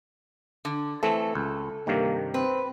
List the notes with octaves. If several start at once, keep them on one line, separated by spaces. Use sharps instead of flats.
D3
E3 A3 C4 A4
C#2
G2 C3 D#3 A#3
C4 B4